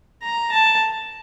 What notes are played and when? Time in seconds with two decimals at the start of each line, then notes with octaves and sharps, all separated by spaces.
0.22 A#5
0.52 A5